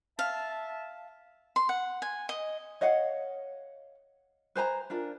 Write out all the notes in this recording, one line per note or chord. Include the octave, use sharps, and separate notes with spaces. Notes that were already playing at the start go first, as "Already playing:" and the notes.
E5 F5 A5
C6
F#5
G#5
D#5
C#5 D#5 F5 F#5
B4 C5 G#5 A#5
D4 F4 A#4